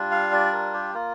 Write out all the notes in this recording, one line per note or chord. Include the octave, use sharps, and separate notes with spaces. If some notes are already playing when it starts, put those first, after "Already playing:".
Already playing: G3 D4 F4
F5
D5
A#4
G4
A#3 F4 A#4